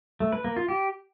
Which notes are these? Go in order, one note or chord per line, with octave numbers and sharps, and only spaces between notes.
A3
B4
A#3
F4
G4